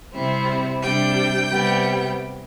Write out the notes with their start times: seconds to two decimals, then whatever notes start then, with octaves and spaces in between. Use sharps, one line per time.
0.14 C3 G3 C4 E4
0.82 C3 G3 D4 G5
1.50 C3 G3 B3